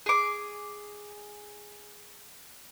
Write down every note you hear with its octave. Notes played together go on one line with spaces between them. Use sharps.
G#4 D6